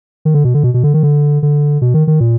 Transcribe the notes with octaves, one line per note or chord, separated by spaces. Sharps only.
D#3
D3
B2
D3
B2
B2
D3
D#3
D3
D3
B2
D#3
D#3
A#2